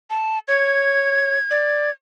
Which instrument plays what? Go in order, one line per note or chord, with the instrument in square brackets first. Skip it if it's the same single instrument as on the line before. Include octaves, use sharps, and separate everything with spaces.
[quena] A5
[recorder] C#5 [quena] G#6
[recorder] D5